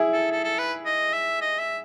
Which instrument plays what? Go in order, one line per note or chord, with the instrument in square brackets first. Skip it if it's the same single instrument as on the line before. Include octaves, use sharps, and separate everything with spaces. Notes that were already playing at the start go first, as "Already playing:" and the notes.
Already playing: [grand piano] E4 G#4
[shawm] A4
A4
A4
B4
D#5
E5
D#5
E5